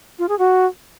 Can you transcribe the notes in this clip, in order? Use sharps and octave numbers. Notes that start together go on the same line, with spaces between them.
F4
G#4
F#4